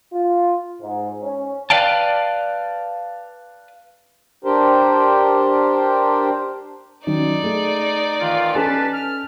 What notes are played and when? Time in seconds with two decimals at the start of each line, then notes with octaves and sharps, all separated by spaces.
0.13 F4
0.82 G#2
1.22 C#4
1.70 B4 D5 F5 G5 A5
4.45 D4 G4 A#4 C5
7.07 D#3 F#3 C#4 D#4 D5
7.43 A3 G#4
8.20 D#3 E3 F4
8.55 C#4 A4 B4 G#5 A5
8.93 F6